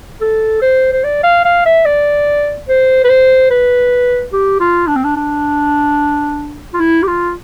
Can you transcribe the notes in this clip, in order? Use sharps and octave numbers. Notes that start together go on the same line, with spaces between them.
A4
C5
C5
D5
F5
F5
E5
D5
C5
B4
C5
B4
G4
F4
D4
C4
D4
D4
F4
E4
G4
F4